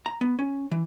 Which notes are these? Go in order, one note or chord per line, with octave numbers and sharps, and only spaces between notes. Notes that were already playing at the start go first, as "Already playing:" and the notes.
A#5
B3
C#4
E3